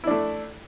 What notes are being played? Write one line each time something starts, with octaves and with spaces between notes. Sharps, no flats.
A3 D4 E4